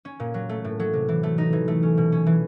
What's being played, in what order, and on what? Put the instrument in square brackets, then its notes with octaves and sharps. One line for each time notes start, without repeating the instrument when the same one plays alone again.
[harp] C#4
A#2
F#3
A3
A2
F#3
C3
E3
A3
D#4
E3
A3
C#4
B2
C#4
E3